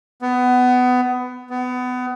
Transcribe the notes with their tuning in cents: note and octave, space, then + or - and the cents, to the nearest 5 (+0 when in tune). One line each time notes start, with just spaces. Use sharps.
B3 +20
B3 +25